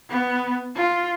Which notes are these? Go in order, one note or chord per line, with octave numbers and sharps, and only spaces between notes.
B3
F4